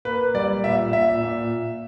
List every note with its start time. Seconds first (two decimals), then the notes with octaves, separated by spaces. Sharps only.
0.05 A#3 B4
0.34 G3 D5
0.64 A#2 E5
0.93 A#2 E5
1.23 A#2